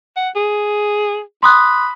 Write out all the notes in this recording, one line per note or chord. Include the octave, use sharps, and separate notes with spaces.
F#5
G#4
B5 C6 D#6 F#6